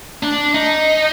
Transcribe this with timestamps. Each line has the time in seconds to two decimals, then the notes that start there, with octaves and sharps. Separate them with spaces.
0.23 D4
0.54 D#4